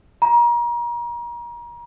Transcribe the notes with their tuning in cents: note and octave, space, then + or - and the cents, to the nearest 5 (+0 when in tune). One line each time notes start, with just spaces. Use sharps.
A#5 +35